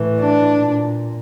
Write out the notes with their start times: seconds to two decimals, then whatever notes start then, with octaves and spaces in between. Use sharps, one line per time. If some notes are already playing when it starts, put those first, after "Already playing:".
Already playing: A2 E3
0.19 D4
0.58 A#2